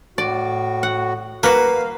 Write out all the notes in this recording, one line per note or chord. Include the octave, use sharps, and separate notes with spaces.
A2 F#4 D5
F#5
A#3 F#4 B4 F5